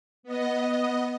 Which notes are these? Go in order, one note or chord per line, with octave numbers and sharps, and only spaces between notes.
B3 D#5